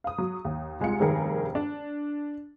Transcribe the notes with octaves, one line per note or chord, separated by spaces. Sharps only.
F5 D#6
F#3
D#2
C2 G#3 F4 C#7
F1 G2 D#3 G#4 A#4
D4